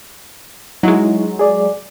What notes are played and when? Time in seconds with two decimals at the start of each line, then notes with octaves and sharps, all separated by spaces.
0.83 F#3 G#3 D#4 E4
1.39 G#4 D5